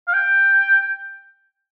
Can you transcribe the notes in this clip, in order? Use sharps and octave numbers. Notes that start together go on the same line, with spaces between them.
F5
G5